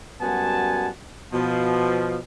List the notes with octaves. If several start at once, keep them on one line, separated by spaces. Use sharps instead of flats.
F#2 G3 B3 F#4 G#5 A5
B2 F3